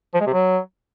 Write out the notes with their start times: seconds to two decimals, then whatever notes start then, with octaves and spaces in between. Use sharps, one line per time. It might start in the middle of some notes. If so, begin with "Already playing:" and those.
0.14 F3
0.21 G#3
0.27 C3
0.33 F#3